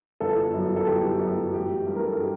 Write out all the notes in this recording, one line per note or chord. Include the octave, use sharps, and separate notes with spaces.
G1 A4
F#2 F#3
A4
G1 G4
F#2 F#3 F#4
A1 G4
G2 F#3
A#4
A4
G4